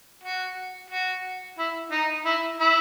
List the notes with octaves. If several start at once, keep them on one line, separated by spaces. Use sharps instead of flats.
F#4
F#4
E4
D#4
E4
E4